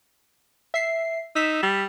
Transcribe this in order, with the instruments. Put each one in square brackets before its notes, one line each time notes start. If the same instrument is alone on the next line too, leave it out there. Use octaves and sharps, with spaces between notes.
[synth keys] E5 C7
[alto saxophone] D#4 [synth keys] E6 B6 E7
[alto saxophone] G3